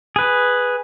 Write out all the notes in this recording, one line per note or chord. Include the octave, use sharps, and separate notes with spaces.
G#4 B4